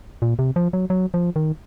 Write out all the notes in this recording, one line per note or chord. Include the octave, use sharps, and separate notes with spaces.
A#2
C3
F3
F#3
F#3
F3
D#3